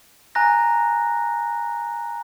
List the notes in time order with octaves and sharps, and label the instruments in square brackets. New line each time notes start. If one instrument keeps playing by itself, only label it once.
[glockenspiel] G#5 A#5 F#6 A#6